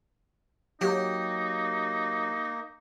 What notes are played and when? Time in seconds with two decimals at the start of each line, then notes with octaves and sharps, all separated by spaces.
0.81 F#3 A#3 D#4 G4